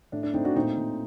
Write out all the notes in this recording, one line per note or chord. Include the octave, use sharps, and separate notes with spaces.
A2 D4
D4
A2 C4 D#4
D4 F#4
A#2 C4 D#4
A#2